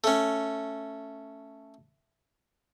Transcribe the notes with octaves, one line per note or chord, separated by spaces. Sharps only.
A3 C#4